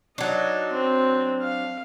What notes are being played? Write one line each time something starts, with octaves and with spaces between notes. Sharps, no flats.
F#3 D4 D#4
C4
F5